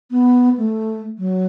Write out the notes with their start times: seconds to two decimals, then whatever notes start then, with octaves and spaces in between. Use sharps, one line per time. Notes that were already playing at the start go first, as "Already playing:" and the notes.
0.11 B3
0.57 A3
1.18 F#3